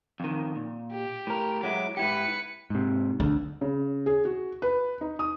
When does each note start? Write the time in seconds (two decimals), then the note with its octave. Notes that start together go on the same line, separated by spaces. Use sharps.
0.20 F2 D#3
0.55 A#2
0.92 G4
1.27 A2 A#4
1.63 F#3 G#3 E4 D6
1.97 G#2 E4 G4 B4 C#7
2.70 G#2 C3
3.20 D2 D3
3.61 C#3
4.06 G#4
4.25 F#4
4.62 B4
5.01 D#4
5.19 D#6